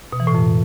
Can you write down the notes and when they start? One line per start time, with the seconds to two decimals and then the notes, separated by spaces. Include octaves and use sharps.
0.13 B2
0.20 E3
0.27 A2
0.34 F2